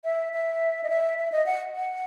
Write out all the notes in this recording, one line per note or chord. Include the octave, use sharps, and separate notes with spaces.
E5
E5
D#5
E5
E5
D#5
F#5
F#5